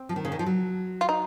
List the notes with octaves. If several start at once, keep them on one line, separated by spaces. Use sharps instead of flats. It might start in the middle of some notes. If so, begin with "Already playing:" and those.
Already playing: C4
F3
D#3
C#3
D#3
F3
F#3
F4
D#4